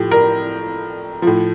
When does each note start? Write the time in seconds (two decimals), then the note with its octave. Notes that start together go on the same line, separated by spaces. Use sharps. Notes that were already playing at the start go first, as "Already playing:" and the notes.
Already playing: A2 F3 G4
0.11 A#4
1.22 A2 F3